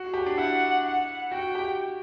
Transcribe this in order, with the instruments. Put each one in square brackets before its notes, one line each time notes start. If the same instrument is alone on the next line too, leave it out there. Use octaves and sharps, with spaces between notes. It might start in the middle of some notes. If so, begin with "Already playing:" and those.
Already playing: [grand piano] F#4
G4
D4
[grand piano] E4 [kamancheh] F#5
[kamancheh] F#5
[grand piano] F#4 [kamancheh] G5
[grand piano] G4